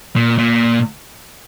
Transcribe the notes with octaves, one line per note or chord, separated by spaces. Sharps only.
A#2
A#2